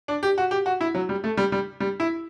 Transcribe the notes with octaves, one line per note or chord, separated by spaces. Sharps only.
D4
G4
F#4
G4
F#4
E4
F#3
G3
A3
G3
G3
G3
E4